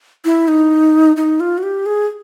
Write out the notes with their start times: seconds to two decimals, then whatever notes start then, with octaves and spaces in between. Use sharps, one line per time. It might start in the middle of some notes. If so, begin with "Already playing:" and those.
0.25 E4
0.48 D#4
1.17 D#4
1.40 F4
1.58 F#4
1.63 G4
1.86 G#4